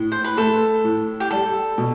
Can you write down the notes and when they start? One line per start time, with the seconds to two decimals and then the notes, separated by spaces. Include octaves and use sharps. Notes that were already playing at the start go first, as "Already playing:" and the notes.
Already playing: A2
0.12 C5
0.24 B4
0.37 A3 A4
0.84 A2
1.20 G4
1.31 G3 A4
1.78 B2